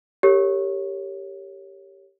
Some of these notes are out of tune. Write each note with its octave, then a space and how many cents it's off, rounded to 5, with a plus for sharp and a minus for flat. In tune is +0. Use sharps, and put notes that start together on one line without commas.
G4 +0 A#4 -35 C#5 +0